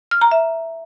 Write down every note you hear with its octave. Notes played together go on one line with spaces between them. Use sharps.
F6
A#5
E5